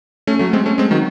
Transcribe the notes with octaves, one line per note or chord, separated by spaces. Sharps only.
A3 C#4
F#3 A3
G#3 C4
A3 C#4
G#3 C4
D#3 F#3